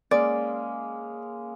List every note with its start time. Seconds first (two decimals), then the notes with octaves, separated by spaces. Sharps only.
0.11 G#3 A#3 C#4 D5